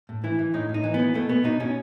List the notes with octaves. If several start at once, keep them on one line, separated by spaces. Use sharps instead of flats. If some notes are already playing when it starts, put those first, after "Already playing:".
A2
E3 E4
E3
A2 D#4
A2
D#4
E3
B3
E3
B2 A3
B2 B3
B2 D#4
B2 C#4